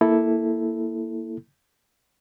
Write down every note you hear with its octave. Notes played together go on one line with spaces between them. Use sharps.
A#3 E4 A4